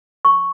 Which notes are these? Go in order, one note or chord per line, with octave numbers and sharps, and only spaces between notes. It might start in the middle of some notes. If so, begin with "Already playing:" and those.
C#6